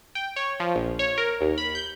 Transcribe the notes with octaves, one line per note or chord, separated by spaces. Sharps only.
G5
C#5
F3
A#1
C#5
A#4
D#2
B5
G6